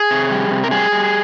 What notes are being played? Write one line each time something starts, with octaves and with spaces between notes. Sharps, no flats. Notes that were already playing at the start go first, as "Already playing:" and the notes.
Already playing: G#4
C3
G3
C3
A#4
G3 G#4
G3